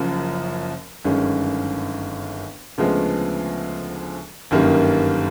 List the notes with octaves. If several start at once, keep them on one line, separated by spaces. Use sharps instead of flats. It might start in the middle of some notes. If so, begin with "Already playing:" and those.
Already playing: F#1 F#2 C#3 F3
G1 F#2 D#3 G#3 C#4
D2 C#3 F3 G#3 B3
G1 F#2 D#3 G3 A#3